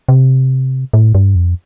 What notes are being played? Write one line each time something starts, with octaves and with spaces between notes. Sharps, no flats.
C3
A2
G2
F2